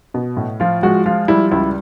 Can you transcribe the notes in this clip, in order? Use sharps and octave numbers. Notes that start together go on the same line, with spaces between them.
B2
A2
F3 F4
G#3 F#4
F3 F4
G3 E4
C#2 E4